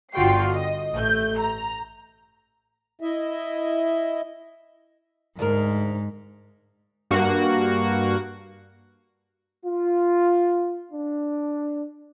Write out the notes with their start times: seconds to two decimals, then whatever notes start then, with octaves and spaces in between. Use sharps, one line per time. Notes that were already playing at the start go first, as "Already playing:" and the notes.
0.14 G1 D3 F4 F#4 G5 C7
0.51 D#5
0.93 A1 A3 G6
1.39 A#5
3.01 E4 D#5 E5
5.39 D2 G#2 G#3 A#4
7.11 G2 A#3 F#4
9.65 F4
10.92 D4